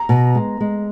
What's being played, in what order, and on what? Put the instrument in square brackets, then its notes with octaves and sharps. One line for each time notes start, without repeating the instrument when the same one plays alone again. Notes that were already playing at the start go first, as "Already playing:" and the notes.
Already playing: [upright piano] A#5
[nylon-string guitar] B2
G#3
G#3